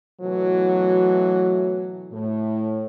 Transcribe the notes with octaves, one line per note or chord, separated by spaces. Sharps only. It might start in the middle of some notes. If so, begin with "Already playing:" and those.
B2 E3 F#3 A3
A2